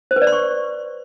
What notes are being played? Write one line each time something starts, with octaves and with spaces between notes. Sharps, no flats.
C5
B4
D5
C6
C#6